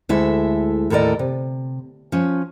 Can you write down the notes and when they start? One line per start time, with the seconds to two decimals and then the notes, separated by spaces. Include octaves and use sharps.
0.09 D2 G#3 E4 A4 E5
0.90 D#2 A2 A4 A#4 D5 D#5
1.19 C3
2.12 F3 C#4